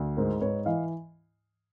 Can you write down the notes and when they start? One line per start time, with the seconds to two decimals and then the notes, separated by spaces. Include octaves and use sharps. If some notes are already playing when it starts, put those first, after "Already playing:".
Already playing: D2
0.17 G#2 A#4 C5
0.41 G#2 B4 C#5
0.65 E3 D#5 F5